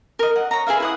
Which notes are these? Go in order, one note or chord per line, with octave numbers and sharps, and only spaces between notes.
A#4 D#5
F#5
C#5 A#5
G#4 B4 E5 F5
E4 F#5 D#6